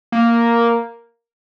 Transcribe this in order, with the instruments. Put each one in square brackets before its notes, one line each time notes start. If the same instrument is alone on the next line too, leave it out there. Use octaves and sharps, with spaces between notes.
[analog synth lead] A#3